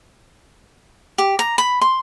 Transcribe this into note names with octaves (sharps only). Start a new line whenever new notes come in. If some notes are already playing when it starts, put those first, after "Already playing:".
G4
A#5
B5
C6